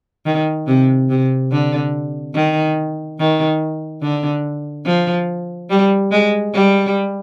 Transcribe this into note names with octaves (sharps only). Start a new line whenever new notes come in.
D#3
C3
C3
D3
D#3
D#3
D3
F3
G3
G#3
G3